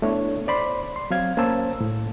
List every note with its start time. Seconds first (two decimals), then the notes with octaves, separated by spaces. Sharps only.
0.02 A3 B3 D4 E4 C#5
0.47 C5 D5 B5 C6
0.96 C6
1.11 F#3 C4 F5 G#6
1.37 A#3 C#4 C5 A5 E6
1.81 A2